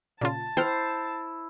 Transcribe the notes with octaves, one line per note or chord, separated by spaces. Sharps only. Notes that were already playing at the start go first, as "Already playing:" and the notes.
A#2 C#3 F4 A5
E4 C5 G5 F6